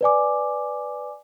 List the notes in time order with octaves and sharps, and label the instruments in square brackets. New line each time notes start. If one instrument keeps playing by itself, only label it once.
[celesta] B4 D5 G#5 D6